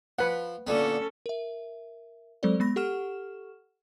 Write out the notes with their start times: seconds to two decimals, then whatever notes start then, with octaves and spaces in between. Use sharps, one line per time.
0.19 F3 B4 F#5
0.67 A#2 D3 B3 C#4 A4
1.26 A#4 E5
2.43 F#3 G#3 C4 A4 C5 D5
2.60 G#3 B3 B5 A#6
2.76 G4 A4 F#5 C#6 F6 E7